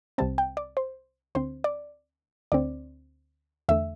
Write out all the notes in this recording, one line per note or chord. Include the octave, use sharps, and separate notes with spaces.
C2 C3 G3 C4 A5
G5
D5
C5
D2 D3 C4 C5
D5
D2 D3 C4 D5
E2 D3 A3 E5